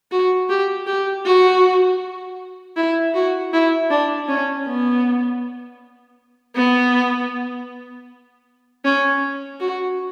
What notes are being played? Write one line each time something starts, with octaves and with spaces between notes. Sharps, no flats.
F#4
G4
G4
F#4
E4
F#4
E4
D4
C#4
B3
B3
C#4
F#4